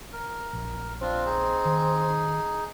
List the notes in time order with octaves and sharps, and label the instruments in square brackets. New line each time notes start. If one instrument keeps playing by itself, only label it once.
[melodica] A#4
[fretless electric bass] A#1
[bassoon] C4 [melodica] D4 F4
[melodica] D#4 G#4
[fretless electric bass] D#3